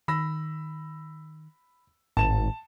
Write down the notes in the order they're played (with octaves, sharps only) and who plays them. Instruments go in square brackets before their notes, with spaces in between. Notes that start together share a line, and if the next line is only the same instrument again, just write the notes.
[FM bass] D#3 [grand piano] B5 E6 A#6
[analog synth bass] G#1 [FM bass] A2 [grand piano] A5 E7